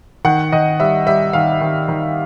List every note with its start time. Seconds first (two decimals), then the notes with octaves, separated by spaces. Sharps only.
0.25 D#3 F#5
0.52 D#3 D#5
0.80 G3 E5
1.07 G3 E5
1.33 D#3 F5
1.61 D#3
1.88 D#3